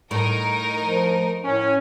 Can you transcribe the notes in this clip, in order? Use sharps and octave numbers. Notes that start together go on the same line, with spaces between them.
A2 D#4 A#4
F3
A2 C#4